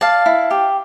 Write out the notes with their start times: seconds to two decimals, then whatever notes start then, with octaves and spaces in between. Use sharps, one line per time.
0.01 D5 F5 A5
0.26 E4
0.51 G4